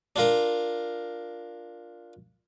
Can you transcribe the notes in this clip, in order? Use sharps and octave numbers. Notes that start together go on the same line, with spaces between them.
D4 F4 A#4